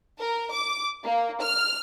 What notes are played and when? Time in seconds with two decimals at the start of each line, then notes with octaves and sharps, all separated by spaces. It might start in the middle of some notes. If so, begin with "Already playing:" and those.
0.20 A#4
0.52 D6
1.04 A#3
1.41 F6